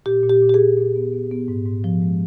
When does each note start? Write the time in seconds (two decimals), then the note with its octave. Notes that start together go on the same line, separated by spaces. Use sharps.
0.06 A#2 G4
0.24 A#2
0.30 G4
0.42 A#2
0.49 G4
0.54 G#4
0.59 A#2
0.77 A#2
0.96 B3
1.13 B3
1.31 B3
1.48 G#2
1.66 G#2
1.84 F3
2.02 G#3